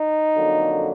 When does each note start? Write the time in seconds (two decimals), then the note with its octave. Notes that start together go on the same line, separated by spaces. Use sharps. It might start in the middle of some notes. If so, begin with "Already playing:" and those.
Already playing: D#4
0.35 F2 D3 F#3 A#3